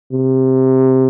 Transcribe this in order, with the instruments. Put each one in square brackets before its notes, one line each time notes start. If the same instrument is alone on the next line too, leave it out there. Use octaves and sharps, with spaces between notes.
[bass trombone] C3